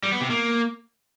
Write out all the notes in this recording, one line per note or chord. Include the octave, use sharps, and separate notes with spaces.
G3
B3
C3
A#3